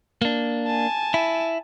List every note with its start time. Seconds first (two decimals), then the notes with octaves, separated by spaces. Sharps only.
0.22 A#3 D4
0.67 G#5 A5
1.14 E4